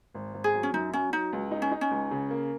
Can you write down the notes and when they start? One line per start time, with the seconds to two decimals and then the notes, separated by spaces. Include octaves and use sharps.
0.14 G#1
0.34 G#1
0.44 G#4
0.55 F#3
0.63 C#4
0.73 F#2 D#4
0.93 F#3 C#4
1.12 F#3 D#4
1.33 C#2
1.51 D#4
1.62 C#4
1.71 D#4
1.81 C#4
1.91 C#2
2.11 C#3
2.30 A#3